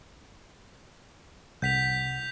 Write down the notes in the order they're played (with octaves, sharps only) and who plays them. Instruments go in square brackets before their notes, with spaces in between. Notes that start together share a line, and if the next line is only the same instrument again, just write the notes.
[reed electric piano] C2 F#5 [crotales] G6 B6 F7